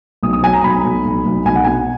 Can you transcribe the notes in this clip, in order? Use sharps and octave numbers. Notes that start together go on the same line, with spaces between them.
B1 D#6
D#6
F#3 G#5
A#5
B1 B5
B1
B1
B1
B1 G#5
F#5
B2 G#5